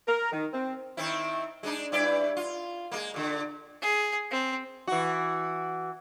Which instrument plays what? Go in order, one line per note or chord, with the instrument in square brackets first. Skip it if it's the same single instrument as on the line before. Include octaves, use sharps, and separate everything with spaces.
[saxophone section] A#4
D#3
C4
[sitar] D#3 C4 E4
G#3 D4 D#4
G2 E4 D5
F4
G#3 A#3
A#2 D3
[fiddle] G#4
C4
[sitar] E3 F#4